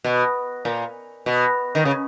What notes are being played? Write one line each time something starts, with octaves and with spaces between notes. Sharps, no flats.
B2
A#2
B2
D#3
C#3